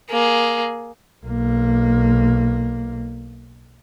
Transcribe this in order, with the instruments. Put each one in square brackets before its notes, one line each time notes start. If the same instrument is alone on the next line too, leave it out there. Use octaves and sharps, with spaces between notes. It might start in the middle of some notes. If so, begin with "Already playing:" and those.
[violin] A#3 G#4
[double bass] B1 A#3